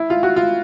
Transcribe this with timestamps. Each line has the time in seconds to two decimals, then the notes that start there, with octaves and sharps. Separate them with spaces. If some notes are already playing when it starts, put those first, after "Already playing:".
Already playing: E4
0.10 F4
0.23 F#4
0.36 F4